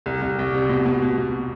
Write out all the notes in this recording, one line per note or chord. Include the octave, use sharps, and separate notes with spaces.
C2
C2
C2
C3
B2
B2
B2
B2